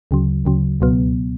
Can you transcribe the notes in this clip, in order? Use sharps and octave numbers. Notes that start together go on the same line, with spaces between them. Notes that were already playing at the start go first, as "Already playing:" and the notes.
D2 C#3 F#3
D2 C#3 F#3
C#2 B2 F#3 B3